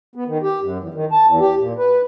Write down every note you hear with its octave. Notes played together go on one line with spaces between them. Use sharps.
B3
D#3
G4
F#2
E2
D#3
A5
E2
G4
A#2
B4